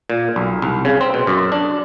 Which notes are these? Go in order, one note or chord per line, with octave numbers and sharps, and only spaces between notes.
A#2
B1
C2
C#3
C4
B2
F#2
D4